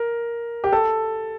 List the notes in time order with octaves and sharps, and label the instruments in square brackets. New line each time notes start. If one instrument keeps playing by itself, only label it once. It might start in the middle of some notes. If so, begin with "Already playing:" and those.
Already playing: [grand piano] A#4
G4
A4